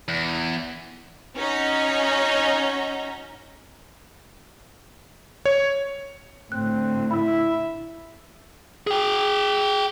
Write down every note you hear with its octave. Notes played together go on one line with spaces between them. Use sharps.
E2
C#4 D#4 F#4 C#5 A#5
C#5
A2 D3 C4 F#6
E4 E5 B5 E6
G#4 G5